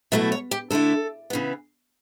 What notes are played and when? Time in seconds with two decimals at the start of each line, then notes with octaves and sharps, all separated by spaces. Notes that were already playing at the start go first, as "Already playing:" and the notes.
0.12 B2 F#3 A3 E4 E5
0.32 C#5
0.51 G4
0.70 D3 A3 E4 A4
1.30 C#3 E3 B3